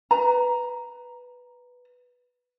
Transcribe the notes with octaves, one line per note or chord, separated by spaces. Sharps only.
B4 A#5